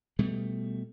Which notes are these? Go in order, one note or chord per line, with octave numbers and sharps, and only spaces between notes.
B2 G3 A3